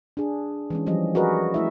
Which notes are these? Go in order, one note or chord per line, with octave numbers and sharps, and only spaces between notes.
D4 G#4
E3 G#3 C#4
E3 F3 G3 C#4 D#5
F#4 G#4 A#4 B4 D5 D#5
A3 E4 E5